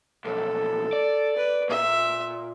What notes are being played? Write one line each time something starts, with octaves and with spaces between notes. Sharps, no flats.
B1 F2 A4
D5
B4
A#2 E5